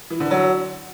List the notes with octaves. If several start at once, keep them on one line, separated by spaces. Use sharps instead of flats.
E3
D3
F#3